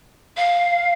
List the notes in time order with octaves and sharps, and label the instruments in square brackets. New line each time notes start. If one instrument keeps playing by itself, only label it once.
[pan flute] F5